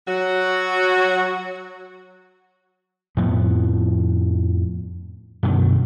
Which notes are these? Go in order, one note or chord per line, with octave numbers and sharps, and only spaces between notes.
F#3 F#4
F2 A2 F3 B3
F#2 B2 D3 D#3